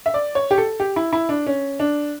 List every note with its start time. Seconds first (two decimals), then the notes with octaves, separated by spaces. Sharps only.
0.06 E5
0.14 D5
0.35 C#5
0.51 G4
0.58 A4
0.80 G4
0.96 E4
1.13 E4
1.29 D4
1.47 C#4
1.80 D4